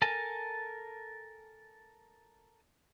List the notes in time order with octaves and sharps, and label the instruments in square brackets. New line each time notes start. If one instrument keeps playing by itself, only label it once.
[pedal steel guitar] A4 A#4 G#5 A5